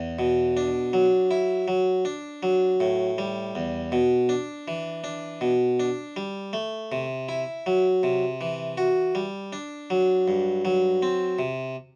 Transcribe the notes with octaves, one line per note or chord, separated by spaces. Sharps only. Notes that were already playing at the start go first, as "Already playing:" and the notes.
Already playing: E2
B2
D4
F#3
E4
F#3
D4
F#3
A2
G3
E2
B2
D4
E3
D4
B2
D4
G3
A3
C3
E4
F#3
C3
E3
F#4
G3
D4
F#3
G2
F#3
C4
C3